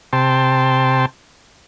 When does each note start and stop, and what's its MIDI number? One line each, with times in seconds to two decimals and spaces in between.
0.13 1.06 48
0.13 1.06 79
0.13 1.06 81
0.13 1.06 84